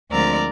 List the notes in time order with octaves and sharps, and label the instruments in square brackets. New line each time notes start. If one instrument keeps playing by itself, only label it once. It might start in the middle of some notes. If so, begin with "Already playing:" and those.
[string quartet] D2 D3 F3 G#3 C4 A#4 D5